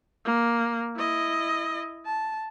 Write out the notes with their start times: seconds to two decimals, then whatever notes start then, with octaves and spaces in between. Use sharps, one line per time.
0.25 A#3
0.96 E4 D#5
2.06 A5